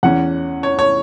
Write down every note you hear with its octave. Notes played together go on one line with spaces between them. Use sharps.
E2 E3 C#4 F#5
C#5
C#5